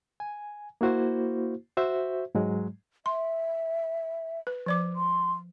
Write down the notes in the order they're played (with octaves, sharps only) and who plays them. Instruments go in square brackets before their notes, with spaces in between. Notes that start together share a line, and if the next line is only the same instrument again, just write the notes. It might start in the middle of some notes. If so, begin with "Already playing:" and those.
[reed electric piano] G#5
A#3 E4 F#4 C5
F#4 C5 E5
G#2 F#3 G#3
[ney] E5 [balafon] C6
[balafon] B4
F3 D5 D6
[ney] C6